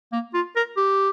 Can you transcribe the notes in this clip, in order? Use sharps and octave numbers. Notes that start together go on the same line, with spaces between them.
A#3
F4
A#4
G4